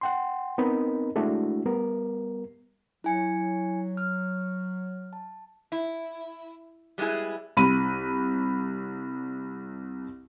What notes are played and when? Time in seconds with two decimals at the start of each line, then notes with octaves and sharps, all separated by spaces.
0.01 F#5 G5 C6
0.58 B3 C4 D#4 A#4 D#5 B5
1.16 G#3 A3 D4 E4 F#4
1.66 G3 B3 A#4
3.04 F#3 E4 G#5 C#7
3.97 F6
5.13 A5
5.72 E4
6.98 G3 G#3 B3 E4 G#4
7.57 C2 B5 D#7